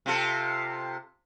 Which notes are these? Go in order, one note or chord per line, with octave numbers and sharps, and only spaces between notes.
C3 F4 A4